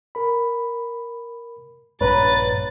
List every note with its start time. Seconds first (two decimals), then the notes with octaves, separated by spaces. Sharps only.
0.15 A#4 B5
2.01 A#1 G2 B4 C#5 A#5 A6